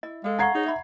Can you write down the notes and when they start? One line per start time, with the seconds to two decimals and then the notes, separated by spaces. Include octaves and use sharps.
0.03 E4 D#5
0.24 G#3 A4 F5
0.39 D#5 F#5 A#5 C#6 G#6 C7
0.54 D#4 G#4 C#5
0.66 E5 B5